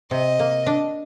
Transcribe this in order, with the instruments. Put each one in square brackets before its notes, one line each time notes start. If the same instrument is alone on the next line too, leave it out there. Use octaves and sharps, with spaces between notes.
[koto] C3 [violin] D#5
[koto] A#3
D4